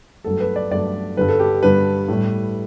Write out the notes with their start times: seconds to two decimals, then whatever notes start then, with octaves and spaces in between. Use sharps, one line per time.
0.24 G2 F#3 A3 A4
0.40 B4
0.56 D5
0.71 G2 F#3 A3 D5
1.17 G2 D3 G3 B4
1.29 A4
1.39 G4
1.63 G2 D3 G3 B4
2.08 A2 G3